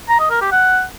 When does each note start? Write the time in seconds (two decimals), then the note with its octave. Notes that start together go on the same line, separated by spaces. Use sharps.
0.09 A#5
0.20 D#5
0.30 A#4
0.41 G4
0.52 F#5